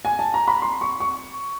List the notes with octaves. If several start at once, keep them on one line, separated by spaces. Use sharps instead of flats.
G#5
A5
A#5
B5
C6
C#6
C#6